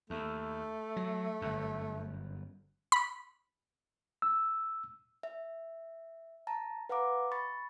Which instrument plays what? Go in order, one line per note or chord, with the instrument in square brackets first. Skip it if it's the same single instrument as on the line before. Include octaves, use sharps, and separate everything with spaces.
[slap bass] D#2 [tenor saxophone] A3
[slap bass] F#3
G1 F#2
[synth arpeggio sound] B5
[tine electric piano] E6
[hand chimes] E5
A5 A#5
B4 F5 F#5 A#5 D6
B5 C#6 A6